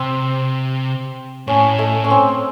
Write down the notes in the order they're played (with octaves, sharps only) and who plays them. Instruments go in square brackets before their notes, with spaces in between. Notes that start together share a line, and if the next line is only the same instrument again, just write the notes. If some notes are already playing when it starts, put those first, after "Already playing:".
Already playing: [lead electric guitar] C3 [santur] C4
[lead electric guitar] A2 [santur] C#4
[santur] A3
C#4
C4